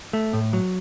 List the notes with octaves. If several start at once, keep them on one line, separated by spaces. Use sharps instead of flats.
A3
A2
F#3